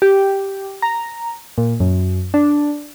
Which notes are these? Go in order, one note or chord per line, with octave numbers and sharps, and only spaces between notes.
G4
A#5
A#2
F#2
D4